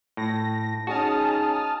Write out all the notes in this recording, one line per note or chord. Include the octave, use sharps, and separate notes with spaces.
A2 A#6
C#4 D#4 F#4 G#4 A5 D#6 F6